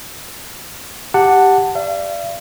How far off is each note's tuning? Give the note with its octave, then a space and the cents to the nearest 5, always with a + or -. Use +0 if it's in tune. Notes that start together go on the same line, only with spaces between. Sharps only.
G4 +0 F#5 +0 A5 +20
D5 +0 F5 -45